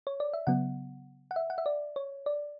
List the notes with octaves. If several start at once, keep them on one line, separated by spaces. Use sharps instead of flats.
C#5
D5
E5
C#3 F#3 B3 F#5
F#5
E5
F#5
E5
D5
C#5
D5